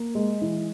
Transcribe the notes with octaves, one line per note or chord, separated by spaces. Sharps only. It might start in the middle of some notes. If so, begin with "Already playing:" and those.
Already playing: A#3
G#3
E3